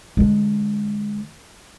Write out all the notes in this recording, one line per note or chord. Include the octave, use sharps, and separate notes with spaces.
D3 G#3